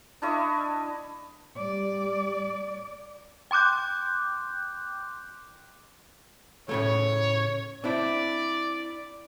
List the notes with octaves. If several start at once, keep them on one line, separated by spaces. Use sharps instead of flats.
D4 E4 D#5 C#6
G3 D5
G5 C6 D6 F#6 G6
A2 C#3 A3 C#5
C4 D4 E4 D5